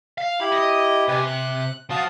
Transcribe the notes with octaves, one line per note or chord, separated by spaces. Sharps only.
F5
E4 G4 B5
D#5
C3 G4 B4 G#5
F#6
F3 F4 F#4 A5 D#6